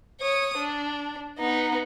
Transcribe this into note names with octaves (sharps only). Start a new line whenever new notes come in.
C#5 D#6
D4
B3 D#4